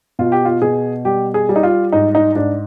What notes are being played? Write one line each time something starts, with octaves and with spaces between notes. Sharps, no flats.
B2 F4
G4
F4
B2 G#4
G3 G4
G#4
G3
D#4
F4
G#2 D#4
D#4
G#2 D4